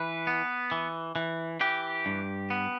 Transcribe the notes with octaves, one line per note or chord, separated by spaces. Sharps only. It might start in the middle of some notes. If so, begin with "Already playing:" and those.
Already playing: E3 B4
B3
E3
E3
E3 G4
G2
B3